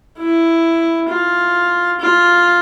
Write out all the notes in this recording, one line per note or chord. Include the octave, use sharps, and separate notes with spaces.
E4
F4
F4